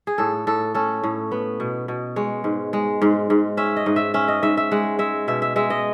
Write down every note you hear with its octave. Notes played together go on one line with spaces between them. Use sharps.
G#4
A2 A4
A2 A4
C#4 A4
A2
B3
B2
B2
G#3 C#5
G#2
G#3
G#2
G#2
C#4 E5
D#5
G#2
E5
C#4 E5
D#5
G#2 E5
E5
G#3 F#5
G#3 E5
B2 E5
E5
G#3 E5
D#5